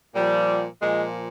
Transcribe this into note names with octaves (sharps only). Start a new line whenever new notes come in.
A#2 F3 G3
A#2 F3 G#3